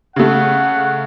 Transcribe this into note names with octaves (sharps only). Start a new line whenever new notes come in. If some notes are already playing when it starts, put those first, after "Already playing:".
C#3 A3 F#5